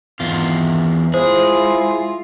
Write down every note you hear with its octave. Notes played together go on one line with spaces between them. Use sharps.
E2 D#3 F4
G#3 E4 F4 G#4 C5